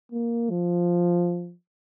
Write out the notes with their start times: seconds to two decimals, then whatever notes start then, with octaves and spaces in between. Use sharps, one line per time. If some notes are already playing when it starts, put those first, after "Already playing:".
0.12 A#3
0.50 F3